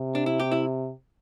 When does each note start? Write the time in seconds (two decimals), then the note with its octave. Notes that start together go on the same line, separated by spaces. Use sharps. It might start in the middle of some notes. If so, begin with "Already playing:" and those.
Already playing: C3
0.15 D4
0.26 E4
0.40 G4
0.52 E4